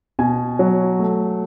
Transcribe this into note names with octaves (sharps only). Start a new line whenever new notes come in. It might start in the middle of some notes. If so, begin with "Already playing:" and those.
B2 G#5
F#3
A3